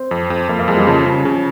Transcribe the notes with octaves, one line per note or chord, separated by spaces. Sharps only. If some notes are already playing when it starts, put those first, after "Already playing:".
Already playing: C4
F2
F2
F2 A#3
A#3
F2 G#3
G3
C#3 F3
C#3
C#3